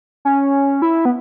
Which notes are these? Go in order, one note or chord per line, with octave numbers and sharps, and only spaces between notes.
C#4
E4
B3